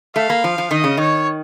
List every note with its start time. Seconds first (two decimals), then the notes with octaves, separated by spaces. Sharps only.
0.16 A3 F5
0.30 A#3
0.44 F3
0.58 F3
0.71 D#3 D#5
0.84 C#3
0.97 D#3 C#5